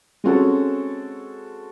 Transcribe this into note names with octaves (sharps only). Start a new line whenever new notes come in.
G#3 C4 C#4 F#4 G#4 A4